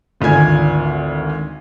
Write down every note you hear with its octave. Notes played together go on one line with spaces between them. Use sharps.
G#1 D2 F4 G#5 G#6